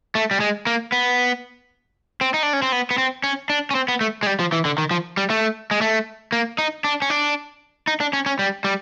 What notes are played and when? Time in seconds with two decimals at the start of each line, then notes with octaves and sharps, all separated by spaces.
0.15 A3
0.31 G3
0.40 G#3
0.67 A#3
0.92 B3
2.21 C4
2.34 D#4
2.43 D4
2.53 C#4
2.62 C4
2.72 B3
2.91 B3
2.98 C4
3.24 C#4
3.50 D4
3.71 C#4
3.75 C4
3.88 B3
4.01 A3
4.23 G#3
4.27 G3
4.40 F3
4.52 E3
4.65 D3
4.78 D#3
4.91 F3
5.17 G3
5.30 A3
5.71 G#3
5.81 A3
6.32 A#3
6.58 D#4
6.84 D4
7.02 C#4
7.10 D4
7.87 D#4
8.01 D4
8.13 C#4
8.26 C#4
8.39 G3
8.64 G3